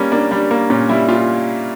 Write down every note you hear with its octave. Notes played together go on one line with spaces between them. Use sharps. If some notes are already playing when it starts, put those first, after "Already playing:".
Already playing: G3 A#3 C#4
A#3 D4
G3 D4
A#3
A#2 C#4
G3 E4
A#2 F4